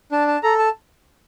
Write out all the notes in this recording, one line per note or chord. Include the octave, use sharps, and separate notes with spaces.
D4 A5
A5
A4 A#5
A5